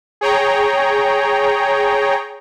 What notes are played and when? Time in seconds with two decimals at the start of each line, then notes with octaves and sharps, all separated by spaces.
0.21 G#4 C#5 G5 A#5